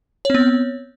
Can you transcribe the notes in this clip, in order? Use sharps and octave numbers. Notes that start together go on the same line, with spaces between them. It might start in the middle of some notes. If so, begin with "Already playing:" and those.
B3 C4 C#5